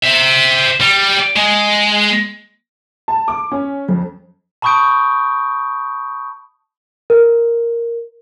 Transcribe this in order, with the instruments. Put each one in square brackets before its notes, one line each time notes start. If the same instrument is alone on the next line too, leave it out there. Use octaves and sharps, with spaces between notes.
[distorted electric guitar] C5 E5
G3
G#3
[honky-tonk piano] A5
D6
C#4
F2
[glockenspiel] A5 B5 C#6 D#6 G6 D7
[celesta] A#4